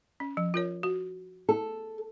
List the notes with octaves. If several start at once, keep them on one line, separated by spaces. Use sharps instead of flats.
C#4
F3
F4 A#4 C#5
F#4
A4